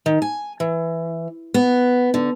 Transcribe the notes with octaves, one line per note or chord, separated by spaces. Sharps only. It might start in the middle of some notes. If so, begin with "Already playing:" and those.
D#3
G#5
E3
B3
D3